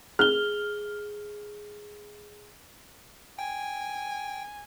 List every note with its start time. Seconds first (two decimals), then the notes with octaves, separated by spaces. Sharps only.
0.19 G#4 F6 G7
3.39 G5 G#5